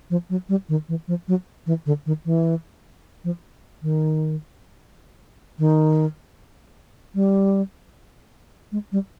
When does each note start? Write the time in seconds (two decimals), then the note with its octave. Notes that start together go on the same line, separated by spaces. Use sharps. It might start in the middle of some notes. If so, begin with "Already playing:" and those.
0.10 F3
0.30 F#3
0.49 G3
0.69 D#3
0.89 E3
1.08 F3
1.28 F#3
1.66 E3
1.86 D3
2.06 D#3
2.25 E3
3.24 F3
3.83 D#3
5.59 D#3
7.15 G3
8.72 G#3
8.92 G3